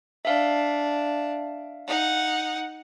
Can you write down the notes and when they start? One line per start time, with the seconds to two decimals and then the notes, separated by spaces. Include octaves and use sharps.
0.25 D4 E5 F5
1.87 D#4 F#5